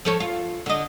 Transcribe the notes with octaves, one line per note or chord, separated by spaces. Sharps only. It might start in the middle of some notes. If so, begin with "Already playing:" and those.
F3 A4 C#5
F4
D3 D#5